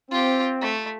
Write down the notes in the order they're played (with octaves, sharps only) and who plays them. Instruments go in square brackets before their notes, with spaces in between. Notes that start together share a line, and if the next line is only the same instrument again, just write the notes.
[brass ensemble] C4 [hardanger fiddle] F4 G4
[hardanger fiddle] A3